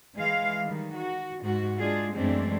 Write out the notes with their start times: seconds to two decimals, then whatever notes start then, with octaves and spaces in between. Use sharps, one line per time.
0.18 E3 G#3 F5
0.66 D#3 G3
0.95 F#4
1.42 G#2 G#3 F#4
1.79 G#3 D4 F4 G#4
2.15 F#2 E3 G#3 A3 C4 D4